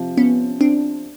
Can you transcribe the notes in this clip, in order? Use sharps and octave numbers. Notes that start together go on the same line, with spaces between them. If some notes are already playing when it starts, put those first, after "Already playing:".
Already playing: C3 F3
B3 C#4
C4 D4